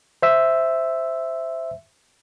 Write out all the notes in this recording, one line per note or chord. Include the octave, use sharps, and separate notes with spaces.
C5 E5 E6